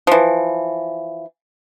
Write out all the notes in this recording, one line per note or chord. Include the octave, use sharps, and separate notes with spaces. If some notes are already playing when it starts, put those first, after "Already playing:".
E3 F3